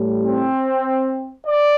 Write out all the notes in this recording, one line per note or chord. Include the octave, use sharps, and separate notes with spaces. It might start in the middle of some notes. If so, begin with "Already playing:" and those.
Already playing: A2 G3
C4
D5